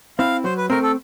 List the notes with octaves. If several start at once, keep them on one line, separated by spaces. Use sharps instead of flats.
C4 E4 F5
F#3 C5
B4
A3 C4 A#4
A4